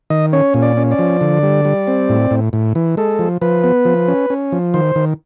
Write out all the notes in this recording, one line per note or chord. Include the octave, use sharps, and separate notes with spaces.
D#3 D#5
C#4 C#5
A#2
D5
C#4
D5
F3
D3
G3
G3
C4
A2
A2
A2
E3
G#3 A4
F3
F3 B4
B3
F3
C#4
C#4
F3
D#3 C5
D#3